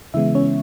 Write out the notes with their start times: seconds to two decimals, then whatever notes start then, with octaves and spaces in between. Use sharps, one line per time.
0.14 C#3 E3 G#3 B3 E4 E5
0.35 C#4 C#5